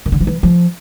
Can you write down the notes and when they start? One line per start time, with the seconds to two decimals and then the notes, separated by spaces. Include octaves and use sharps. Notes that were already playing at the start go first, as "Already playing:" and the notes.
0.06 D#3
0.12 D3
0.21 F3
0.27 E3
0.43 F3